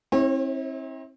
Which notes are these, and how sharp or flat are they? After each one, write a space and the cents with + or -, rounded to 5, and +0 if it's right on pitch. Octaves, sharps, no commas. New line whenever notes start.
C4 +30 E4 -35 C#5 -35